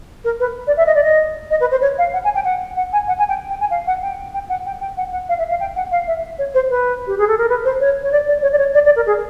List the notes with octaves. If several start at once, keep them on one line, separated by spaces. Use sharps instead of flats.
A#4
B4
D5
E5
D#5
D5
D#5
D#5
B4
C5
C#5
F5
F#5
G#5
G5
F#5
F#5
G#5
F#5
G#5
G5
G5
G#5
F5
F#5
G5
G5
F#5
G5
G5
F#5
F#5
F5
E5
F5
G5
F#5
F5
E5
C#5
C5
B4
G4
G#4
A4
A#4
B4
C5
C#5
C#5
D5
D5
C#5
D5
C#5
D5
D5
A#4
G#4